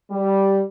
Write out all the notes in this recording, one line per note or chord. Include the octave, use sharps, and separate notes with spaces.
G3